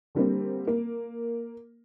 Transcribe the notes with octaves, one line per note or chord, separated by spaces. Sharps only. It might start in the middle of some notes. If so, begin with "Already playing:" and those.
D3 G3 A#3 C4
A#3